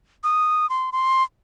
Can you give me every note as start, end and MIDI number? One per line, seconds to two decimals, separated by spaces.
0.24 0.69 87
0.70 0.90 84
0.92 1.23 84